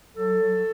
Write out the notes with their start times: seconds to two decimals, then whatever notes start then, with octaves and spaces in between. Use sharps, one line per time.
0.15 F#3 A4
0.41 F#3